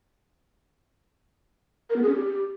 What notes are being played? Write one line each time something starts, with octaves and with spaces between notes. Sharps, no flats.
A#4
B3
G#4
C#4
G4